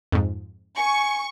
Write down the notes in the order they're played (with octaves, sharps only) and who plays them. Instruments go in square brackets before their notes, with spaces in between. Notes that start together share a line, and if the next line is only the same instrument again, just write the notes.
[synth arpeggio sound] F2 G#2
[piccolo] G#5 [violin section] C#6